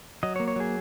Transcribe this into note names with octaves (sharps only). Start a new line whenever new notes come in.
F#3 D#5
C#5
A#3
C#5
F#3 G#4